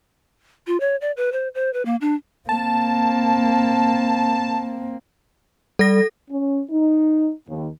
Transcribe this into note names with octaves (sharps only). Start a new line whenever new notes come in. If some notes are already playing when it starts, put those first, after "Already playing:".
F4
C#5
D5
B4
C5
C5
B4
A#3
D4
A#3 C4 A5
G3 A4 A#6
C#4
D#4
D#2